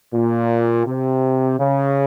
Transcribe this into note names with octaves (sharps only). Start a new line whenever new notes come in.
A#2
C3
C#3